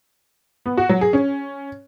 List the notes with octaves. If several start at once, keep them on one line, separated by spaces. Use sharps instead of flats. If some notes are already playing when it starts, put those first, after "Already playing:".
B3
F#4
F#3
G#4
C#4